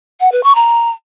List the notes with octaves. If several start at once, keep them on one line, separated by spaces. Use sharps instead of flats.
F#5
B4
C#6
A#5